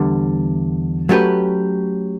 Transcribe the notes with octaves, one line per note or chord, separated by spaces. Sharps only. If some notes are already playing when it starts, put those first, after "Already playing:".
Already playing: E2 D3 G3
F#3 A3 C#4 G4 B4